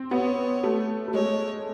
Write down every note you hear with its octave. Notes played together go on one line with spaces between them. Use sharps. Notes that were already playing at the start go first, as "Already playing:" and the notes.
Already playing: C4
B3 C#5
A3
A3
G#3 C#5